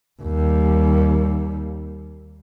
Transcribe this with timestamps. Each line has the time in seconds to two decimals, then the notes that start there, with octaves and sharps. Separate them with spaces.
0.22 D#2 G3